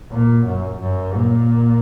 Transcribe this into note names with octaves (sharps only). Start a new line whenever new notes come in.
A#2
F#2
F#2
A#2